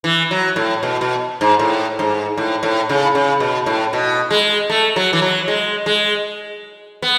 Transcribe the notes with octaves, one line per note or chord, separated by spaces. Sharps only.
E3
F#3
A2
B2
B2
G#2
A2
G#2
A2
A2
C#3
C#3
B2
A2
B2
G#3
A3
F#3
E3
F#3
G#3
G#3
B3